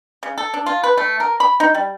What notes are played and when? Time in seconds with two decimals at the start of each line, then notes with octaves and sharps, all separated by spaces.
0.23 C#3
0.38 A4
0.54 D4
0.66 F4
0.83 B4
0.97 A3
1.20 A#4
1.40 B5
1.60 D#4
1.74 G3